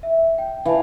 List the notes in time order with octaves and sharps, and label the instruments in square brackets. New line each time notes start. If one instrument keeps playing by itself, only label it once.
[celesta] E5
G5
[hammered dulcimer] E3 F5 [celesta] G5 A5